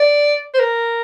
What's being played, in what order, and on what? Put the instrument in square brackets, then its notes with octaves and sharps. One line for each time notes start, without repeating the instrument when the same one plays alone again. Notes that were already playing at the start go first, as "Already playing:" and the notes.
Already playing: [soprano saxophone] D5
C5
A#4